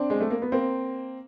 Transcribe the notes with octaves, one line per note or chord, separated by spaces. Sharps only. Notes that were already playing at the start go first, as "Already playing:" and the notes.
Already playing: C4 D4
G#3
A3
A#3
B3
A#3 C4